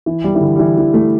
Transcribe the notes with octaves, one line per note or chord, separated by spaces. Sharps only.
E3
G3
E3
D3
G3
E3
E3
A3